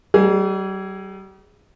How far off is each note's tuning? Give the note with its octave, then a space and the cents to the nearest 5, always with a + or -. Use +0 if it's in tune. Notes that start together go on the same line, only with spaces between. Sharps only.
G3 -40 G#4 +0 D#5 -25